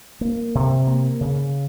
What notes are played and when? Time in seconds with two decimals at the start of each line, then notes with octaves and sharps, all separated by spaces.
0.21 A#3
0.55 C3
0.87 A#3
1.21 C#3